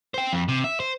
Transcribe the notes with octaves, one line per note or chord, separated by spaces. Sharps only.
C5 G5
F2
C3
E5
C5